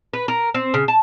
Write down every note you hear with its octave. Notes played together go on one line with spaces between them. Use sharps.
B4
A#4
C4
C#3
A5